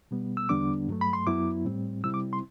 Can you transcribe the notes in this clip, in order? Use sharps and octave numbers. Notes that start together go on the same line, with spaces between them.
B2 G3 B3
E6
E2 D3 G3 B3 D4 D6
G2 F#3 A3
B5
C6
F#2 F#3 B3 E4 D6
A2 G3 C4
C3 G3 C4 E4 E6
D6
C6